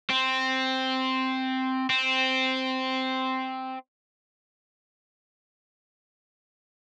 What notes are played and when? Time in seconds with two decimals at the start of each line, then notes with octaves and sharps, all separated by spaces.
0.10 C4
1.90 C4